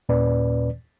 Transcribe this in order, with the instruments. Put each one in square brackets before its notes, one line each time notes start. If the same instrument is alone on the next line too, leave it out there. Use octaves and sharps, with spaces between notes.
[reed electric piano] D#2 A#2 C#4 B4 D5